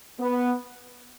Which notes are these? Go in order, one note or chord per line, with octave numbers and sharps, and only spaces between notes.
B3